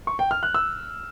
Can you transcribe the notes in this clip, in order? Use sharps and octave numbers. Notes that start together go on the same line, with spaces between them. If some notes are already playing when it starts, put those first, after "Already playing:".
C#6
G5
F6
F#6
E6